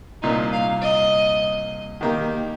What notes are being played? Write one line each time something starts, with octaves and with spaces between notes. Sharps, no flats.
C2 A#2 A#3 D#4
F5
D#5
D#3 A#3 G4